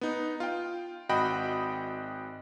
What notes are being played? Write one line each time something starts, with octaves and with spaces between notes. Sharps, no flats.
B3 D#4
F4 G5
G#1 F#4 D#5 G5 B5